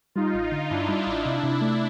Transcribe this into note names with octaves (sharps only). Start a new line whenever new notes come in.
G3 D#4 F4
A1
D3
G2 D4 E4
G3
A1
C3 D4 E4
C3
A3